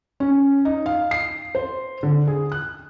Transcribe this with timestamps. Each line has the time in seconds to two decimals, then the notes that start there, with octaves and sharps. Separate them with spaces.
0.20 C#4
0.65 D#4
0.86 F5
1.11 C7
1.55 C5
2.03 D3
2.27 G#4
2.52 F#6